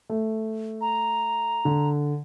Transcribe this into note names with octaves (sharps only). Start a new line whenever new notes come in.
A3
A#5
D3